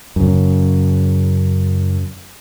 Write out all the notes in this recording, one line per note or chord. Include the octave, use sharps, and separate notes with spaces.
F#2 C#3